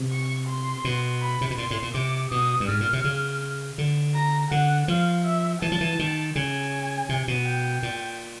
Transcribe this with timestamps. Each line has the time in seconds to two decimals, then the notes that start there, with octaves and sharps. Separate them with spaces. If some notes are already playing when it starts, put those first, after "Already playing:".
Already playing: C3
0.11 C#6
0.48 C6
0.85 B2
1.21 B5
1.41 C3
1.50 B2
1.58 A#2 C6
1.71 A2
1.82 A#2
1.94 C3 D6
2.31 B2 D#6
2.60 G2
2.68 G#2 F6
2.80 A#2
2.93 C3
3.04 C#3
3.78 D3
4.15 A#5
4.51 D3 F#5
4.88 F3 F5
5.26 E5
5.62 E3 A5
5.72 F3
5.81 E3
5.99 D#3
6.35 C#3 G#5
7.09 C3
7.28 B2
7.46 G5
7.83 A#2